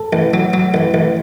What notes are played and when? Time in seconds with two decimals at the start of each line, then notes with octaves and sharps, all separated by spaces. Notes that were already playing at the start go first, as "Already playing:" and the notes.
Already playing: A4
0.13 A1
0.34 F#3
0.54 F#3
0.74 A1
0.94 A1